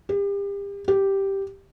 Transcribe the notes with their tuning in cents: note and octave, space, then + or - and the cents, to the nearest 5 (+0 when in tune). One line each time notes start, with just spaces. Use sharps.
G4 +35
G4 -5